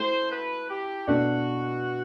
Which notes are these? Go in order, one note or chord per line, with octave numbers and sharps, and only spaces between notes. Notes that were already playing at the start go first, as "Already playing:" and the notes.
Already playing: A3 E4 A4 C5
B4
G4
B2 A3 D4 F#4 A4 D5